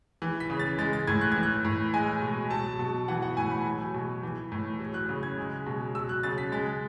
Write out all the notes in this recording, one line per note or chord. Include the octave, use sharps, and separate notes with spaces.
E3
B6
C#3
A6
G#3 A6
A6
A2 G#6
F#6
E3 G#6
F#6
A2
G#3 G#5
B2
F#3 A5
B2
E3 F#5
F#5
A2 G#5
B5
F#3
B2
E3
A2
F#3
F#6
C#3
G#6
G#3
B2
F#3 E6
F#6
C#3 A6
B6
G#3 A6